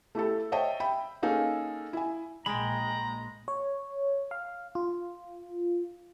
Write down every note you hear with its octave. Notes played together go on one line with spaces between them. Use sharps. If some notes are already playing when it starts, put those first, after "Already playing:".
A3 E4 G4 A4
C5 C#5 D#5 E5 G5 A5
E5 G5 B5
A#3 C#4 D#4 G#4 A4
E4 G#5
A#1 A#2 G#3 G5 A#5 B5
C#5
F5
F4